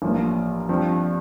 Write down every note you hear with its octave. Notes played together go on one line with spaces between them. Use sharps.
A1 G2 F3 A#3
G2 F3 C4